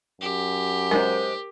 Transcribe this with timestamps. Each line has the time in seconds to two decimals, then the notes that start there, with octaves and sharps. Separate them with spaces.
0.21 F#2 G4
0.91 G#3 D#4 A#4 C5